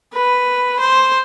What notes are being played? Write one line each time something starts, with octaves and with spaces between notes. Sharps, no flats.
B4
C5